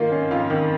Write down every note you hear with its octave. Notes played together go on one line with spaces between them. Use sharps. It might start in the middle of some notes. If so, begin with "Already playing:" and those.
Already playing: D#3 A#3 F4 F5
C#4
F2 F4 F5
D#3